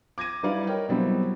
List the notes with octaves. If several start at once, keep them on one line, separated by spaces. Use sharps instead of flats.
D6 G#6 A#6 D#7
G3 D#4 E4 B4 D5 F5
A#4 C#5 D#5 G5
B2 F#3 G3 C4 E4